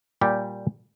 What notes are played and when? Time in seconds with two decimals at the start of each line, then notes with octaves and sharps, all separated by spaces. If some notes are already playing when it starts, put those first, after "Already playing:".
0.21 A#2 G3 G4